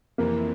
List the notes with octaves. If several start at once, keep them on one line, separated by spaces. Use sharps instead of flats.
F2 C3 E3 A#3